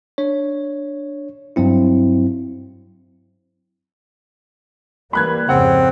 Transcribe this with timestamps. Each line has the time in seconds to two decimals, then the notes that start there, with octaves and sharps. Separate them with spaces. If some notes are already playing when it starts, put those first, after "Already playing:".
0.18 D4 C#5
1.56 G2 F#3 C4 E4
5.13 E3 G3 A#3 B5 F#6 G#6
5.49 F2 G#2 C#3 C4 F#5